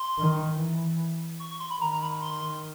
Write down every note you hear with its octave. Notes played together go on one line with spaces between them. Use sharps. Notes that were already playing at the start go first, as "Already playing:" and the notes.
Already playing: C6
D#3
E3
C#6
C#6
C6
B5
D#3 A#5
A#5
B5
C6